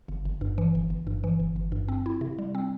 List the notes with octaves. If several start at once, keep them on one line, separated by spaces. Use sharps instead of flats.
G1
G1
G2
E3
G1
G1
G2
E3
G1
G1
G2
C4
E4
C3
G3
C4